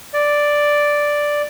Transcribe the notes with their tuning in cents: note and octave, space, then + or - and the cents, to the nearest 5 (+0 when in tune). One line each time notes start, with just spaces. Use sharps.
D5 +0